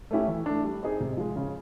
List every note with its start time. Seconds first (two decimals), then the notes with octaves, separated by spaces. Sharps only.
0.11 A3 C#4 E4 G4
0.28 E3
0.46 A3 D4
0.64 G3
0.83 C4 D#4 G#4
1.00 C3
1.17 F3 G#3
1.36 C#3